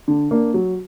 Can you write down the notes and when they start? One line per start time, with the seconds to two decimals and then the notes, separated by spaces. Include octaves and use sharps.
0.08 D3
0.31 A#3 D4
0.54 F#3